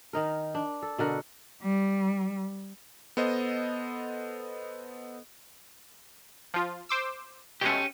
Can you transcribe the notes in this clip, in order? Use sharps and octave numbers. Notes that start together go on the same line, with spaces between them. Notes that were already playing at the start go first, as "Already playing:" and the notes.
D#3 D#4 A#4
D4
A4
B2 D3 A#4 F#5
G3
B3 A4 C5 D#5
F3 F4
C5 D6 E6
B2 G#3 A3 C#4 G4